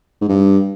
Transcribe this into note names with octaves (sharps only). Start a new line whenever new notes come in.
G#2
G2